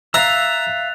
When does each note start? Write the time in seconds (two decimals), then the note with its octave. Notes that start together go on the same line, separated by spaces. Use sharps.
0.14 E5 F5 A#5 E6 F#6 A6 F7